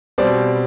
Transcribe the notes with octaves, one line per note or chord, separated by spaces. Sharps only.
B2 G3 C4 D5